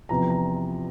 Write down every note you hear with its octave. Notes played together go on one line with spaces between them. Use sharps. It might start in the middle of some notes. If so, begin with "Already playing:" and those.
E2 C3 F3 A#5
A#5